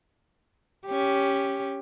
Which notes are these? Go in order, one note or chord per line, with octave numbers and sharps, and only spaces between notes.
C#4 G4